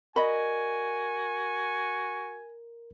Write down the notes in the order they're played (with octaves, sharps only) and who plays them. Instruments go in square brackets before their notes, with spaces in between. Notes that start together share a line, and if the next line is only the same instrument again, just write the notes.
[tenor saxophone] F#4 [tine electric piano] A#4 [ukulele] D5 D#5 B5 [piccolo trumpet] G#5